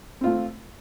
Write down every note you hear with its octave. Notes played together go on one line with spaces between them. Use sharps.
A3 C4 F4